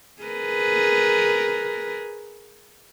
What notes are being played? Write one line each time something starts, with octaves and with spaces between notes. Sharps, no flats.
G#4 A#4 B4